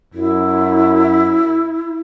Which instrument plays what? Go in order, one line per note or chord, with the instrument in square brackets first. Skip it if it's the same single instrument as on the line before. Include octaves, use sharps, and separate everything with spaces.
[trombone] F#2 [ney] E4